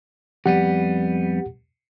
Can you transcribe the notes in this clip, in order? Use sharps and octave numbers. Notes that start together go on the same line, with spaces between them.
F2 G3 B3 G4 F#5